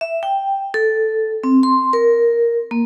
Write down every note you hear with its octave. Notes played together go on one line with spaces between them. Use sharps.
E5
G5
A4
C4
C6
A#4
A#3